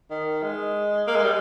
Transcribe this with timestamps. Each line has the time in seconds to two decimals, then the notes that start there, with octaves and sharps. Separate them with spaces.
0.11 D#3
0.43 G#3
1.07 A#3
1.16 G#3
1.23 G3